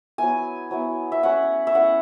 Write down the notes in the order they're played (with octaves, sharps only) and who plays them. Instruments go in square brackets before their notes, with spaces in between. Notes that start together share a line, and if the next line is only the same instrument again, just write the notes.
[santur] F#3 B3 E4 G#5
F#3 B3 E4
E5
A3 C#4 E4 F#5
E5
A3 C#4 E4 F#5